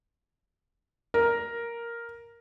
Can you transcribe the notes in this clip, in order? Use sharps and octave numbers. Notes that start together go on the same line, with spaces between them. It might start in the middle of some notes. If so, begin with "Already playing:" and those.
A#4